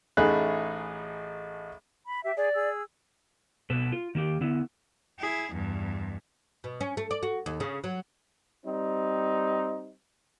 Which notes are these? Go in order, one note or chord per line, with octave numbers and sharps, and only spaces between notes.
A1 A3 D#4 G#4 B5 F#6
B5
G4 E5
G#4 D5
G#4 E6
B2 B3 A4 B4
F4
D#3 A#3 F#4 G4
D3 B3 E4
E4 G#4
E2 G2
B2
C#4
A3
D5
F#4
D#2
C#3
F#3
G3 C4 D#4